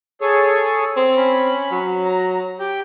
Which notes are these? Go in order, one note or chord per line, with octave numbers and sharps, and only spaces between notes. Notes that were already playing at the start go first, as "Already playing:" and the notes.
G#4 A4 C#5
C4
C#4 B5
F#3
A#5
G4 G5